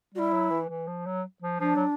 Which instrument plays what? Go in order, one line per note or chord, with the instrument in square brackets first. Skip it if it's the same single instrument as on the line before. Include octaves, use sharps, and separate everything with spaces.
[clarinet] G3 [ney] F#4
[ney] E4
[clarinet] F#3
E3
E3
F3
F#3
F3
[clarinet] F3 [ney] D4
[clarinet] F#3